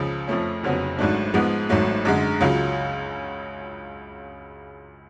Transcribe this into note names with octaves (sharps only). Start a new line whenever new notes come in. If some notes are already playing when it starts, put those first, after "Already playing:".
Already playing: C#2 C#3 F3
F2 F3 A3 C#4
F1 F2 C#3 F#3 B3
G#1 G#2 F#3 A3 D4
G#2 F3 G#3 B3
G#1 G#2 F#3 A3
F#2 D3 G#3
C#2 C#3 F#3 C#4 F4